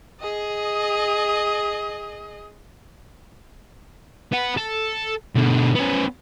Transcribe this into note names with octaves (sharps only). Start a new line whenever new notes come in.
G#4 D#5
B3 F#5
A4
B2 D3
B3 C#4